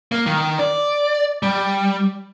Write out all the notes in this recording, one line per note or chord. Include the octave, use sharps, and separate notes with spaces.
A#3
D#3
D5
G3